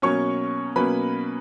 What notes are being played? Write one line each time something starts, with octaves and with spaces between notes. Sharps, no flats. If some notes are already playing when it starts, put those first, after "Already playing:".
B2 F#3 A#3 C#4 C#5 C#6
B2 F#3 A#3 C#4 B4 B5